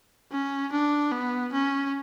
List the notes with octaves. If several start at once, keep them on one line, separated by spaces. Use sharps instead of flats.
C#4
D4
B3
C#4